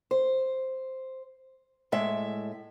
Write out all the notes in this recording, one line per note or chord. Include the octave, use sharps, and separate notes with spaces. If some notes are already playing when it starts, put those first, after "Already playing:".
C5
A2 G#3 E5